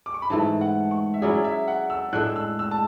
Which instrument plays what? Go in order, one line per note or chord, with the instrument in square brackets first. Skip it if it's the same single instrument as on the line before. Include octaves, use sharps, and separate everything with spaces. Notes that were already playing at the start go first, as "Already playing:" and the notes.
[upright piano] D6
C#6
B5
[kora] G#2 E3 A3 [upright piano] A5
[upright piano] F#5
C#6
E5
[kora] F#3 C#4 E4 G#4 [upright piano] D5
[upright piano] E5
F#5
E6
[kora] A2 G#3 D4 A4 [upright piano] F#6
[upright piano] E6
E6
A5